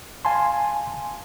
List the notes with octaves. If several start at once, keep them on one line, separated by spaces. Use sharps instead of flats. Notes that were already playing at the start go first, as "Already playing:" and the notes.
F5 G#5 A5 C6